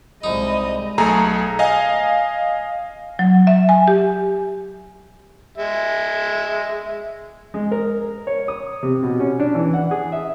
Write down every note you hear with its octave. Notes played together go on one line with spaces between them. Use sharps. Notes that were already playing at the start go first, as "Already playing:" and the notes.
C2 G#3 D#4 D#5 B5
B1 A3 G#4 A#5
D#5 F5 G#5
F#3
E5
G#5
G4
G#3 E5
G#3
A#4
C#5
D#6
C3
B2
C#4
D4
E3
F#5
G#4
E5